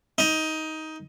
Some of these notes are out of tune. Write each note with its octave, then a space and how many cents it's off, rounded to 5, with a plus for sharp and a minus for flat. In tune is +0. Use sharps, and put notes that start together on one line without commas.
D#4 +15